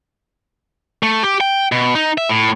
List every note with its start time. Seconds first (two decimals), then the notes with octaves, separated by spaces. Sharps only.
1.03 A3
1.23 G4
1.41 G5
1.72 B2
1.95 D#4
2.18 E5
2.29 A2